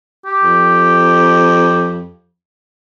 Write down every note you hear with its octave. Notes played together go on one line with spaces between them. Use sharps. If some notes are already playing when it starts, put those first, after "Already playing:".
G4
F2